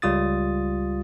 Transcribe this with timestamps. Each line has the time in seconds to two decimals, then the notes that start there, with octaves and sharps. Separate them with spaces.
0.02 C#2 G3 F4 D#6 A6